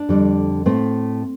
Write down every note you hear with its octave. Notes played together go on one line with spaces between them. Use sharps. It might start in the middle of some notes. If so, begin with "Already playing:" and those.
Already playing: D4
F2 D3 G3
A2 A3 C4